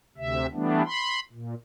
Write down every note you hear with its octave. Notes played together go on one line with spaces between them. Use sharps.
D2 C3 E5
E3 G3 A3 B3 D4
B5 C6
A#2